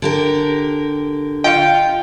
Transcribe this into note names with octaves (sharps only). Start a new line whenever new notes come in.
D3 G4 A#4
F4 D#5 F5 G5